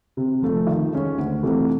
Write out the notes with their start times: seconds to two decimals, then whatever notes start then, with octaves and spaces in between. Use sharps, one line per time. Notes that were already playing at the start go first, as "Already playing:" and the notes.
0.17 C3
0.42 F3 A3
0.67 D#3
0.93 G#3 C#4
1.18 D2
1.43 C3 E3 A3